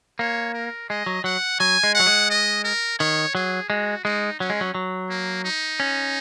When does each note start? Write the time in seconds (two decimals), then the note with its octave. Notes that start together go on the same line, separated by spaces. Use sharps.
0.19 A#3 C#5
0.54 A#4
0.90 G#3 D#5
1.06 F#3
1.24 F#3 F#5
1.60 F#3 G#5
1.83 G#3
1.95 F#3 F#5
2.06 G#3
2.30 D#5
2.64 A#4
2.99 D#3 C#5
3.35 F#3 G#4
3.70 G#3 F#4
4.05 G#3 D#4
4.40 F#3 C#4
4.50 G#3
4.61 F#3
4.75 F#3
5.10 A#3
5.45 D#4
5.80 C#4